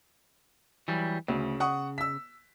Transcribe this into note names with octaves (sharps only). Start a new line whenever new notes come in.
E3 F#3 G3
D2 C#3
F#5 C#6 D#6
E6 B6